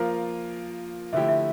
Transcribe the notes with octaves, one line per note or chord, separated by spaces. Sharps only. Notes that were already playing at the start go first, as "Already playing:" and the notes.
Already playing: F3 A#3 F4 A#4 F5
D3 F3 A3 E4 G4 E5
E5